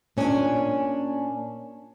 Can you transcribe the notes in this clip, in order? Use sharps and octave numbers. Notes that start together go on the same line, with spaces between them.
A#2 C#4 D4 G#4 G#5